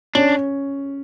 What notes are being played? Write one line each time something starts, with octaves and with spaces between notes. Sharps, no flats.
C#4 D4